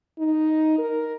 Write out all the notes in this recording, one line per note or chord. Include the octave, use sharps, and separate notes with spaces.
D#4
A#4